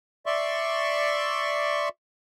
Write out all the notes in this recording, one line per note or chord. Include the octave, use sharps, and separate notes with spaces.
D5 E5 C6 C#6